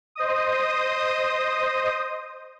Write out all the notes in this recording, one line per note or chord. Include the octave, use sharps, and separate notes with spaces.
C5 D#5 D#6